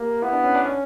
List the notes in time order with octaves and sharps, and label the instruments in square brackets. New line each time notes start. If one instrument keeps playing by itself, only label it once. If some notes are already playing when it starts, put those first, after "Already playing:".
Already playing: [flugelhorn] A#3 [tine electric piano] G4
[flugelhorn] B3 [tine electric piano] E4
[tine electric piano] D4
C#4
D4
C#4